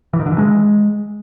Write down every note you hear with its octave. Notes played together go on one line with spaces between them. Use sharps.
E3
D#3
D3
E3
G#3